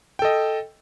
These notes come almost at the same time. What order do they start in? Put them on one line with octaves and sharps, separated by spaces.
G5 A4 D#5